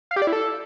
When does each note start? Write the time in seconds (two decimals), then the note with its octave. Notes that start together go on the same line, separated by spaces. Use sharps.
0.11 F5
0.16 G4
0.22 D5
0.27 E4
0.33 A4